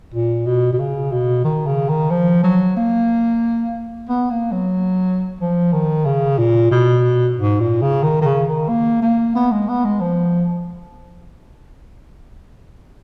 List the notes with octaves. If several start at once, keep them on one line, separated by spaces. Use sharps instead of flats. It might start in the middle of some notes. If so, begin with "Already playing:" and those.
A#2
B2
B2
C#3
B2
D#3
C#3
D#3
F3
F#3
A#3
B3
A#3
F#3
F3
D#3
C#3
A#2
B2
G#2
A#2
C#3
D#3
D#3
C#3
D#3
A#3
A#3
B3
G#3
B3
G#3
F3